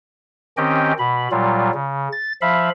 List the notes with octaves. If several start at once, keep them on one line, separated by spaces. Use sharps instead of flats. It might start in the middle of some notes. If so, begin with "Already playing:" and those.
D#3 C4 C#4 G4 D#5 G5
B2 B5
A#2 F#3 G3 F4
C#3
A6
F3 E5 F5 B5